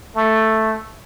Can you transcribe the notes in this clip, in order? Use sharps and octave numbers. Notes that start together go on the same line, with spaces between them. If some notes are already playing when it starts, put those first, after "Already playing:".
A3